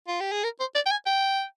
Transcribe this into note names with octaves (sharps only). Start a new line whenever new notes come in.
F4
G4
G#4
A#4
C5
D5
G5
G#5
G5